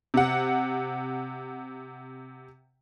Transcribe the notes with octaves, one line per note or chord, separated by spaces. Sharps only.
C3 F#5